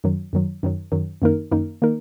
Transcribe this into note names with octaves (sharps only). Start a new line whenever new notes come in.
F#2 D#3 F#3
F#2 D#3 F#3
F#2 D#3 F#3
F#2 D#3 F#3
F#2 D#3 A#3 D#4 A#4
F#2 D#3 A#3 D#4 A#4
D#3 A#3 D#4 A#4